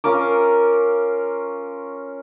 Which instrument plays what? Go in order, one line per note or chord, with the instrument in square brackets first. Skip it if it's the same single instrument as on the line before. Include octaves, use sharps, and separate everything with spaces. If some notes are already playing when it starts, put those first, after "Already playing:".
[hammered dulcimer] C#4 F4 A#4 D6